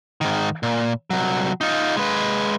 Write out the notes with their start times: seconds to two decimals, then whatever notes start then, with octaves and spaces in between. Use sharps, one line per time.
0.21 G#2 D#3
0.63 A#2
1.10 C2 F#3
1.61 D#4 F4
1.97 G#3 B4